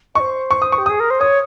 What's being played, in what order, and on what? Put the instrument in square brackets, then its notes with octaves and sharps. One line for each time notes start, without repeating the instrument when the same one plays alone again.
[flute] C5 D#5 [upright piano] C#6
[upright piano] C#6
D#6
C#6
[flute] G4
[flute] G#4 [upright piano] D#6
[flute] A#4
C5
[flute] C#5 [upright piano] D#6